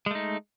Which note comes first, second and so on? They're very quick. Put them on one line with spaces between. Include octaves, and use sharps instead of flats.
G#3 A3 D#4